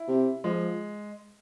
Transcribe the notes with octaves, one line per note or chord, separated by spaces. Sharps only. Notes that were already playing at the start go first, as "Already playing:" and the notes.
Already playing: E4
C3
F3 G#3